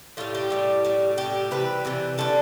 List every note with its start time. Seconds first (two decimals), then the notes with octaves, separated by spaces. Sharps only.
0.17 A2 G3 F4
0.35 G4
0.50 A2 G3
0.85 A2 G3
1.17 A2 G3 G4
1.51 C3 E3 G3 B4
1.85 C3 E3 G3
2.18 D3 G3 A4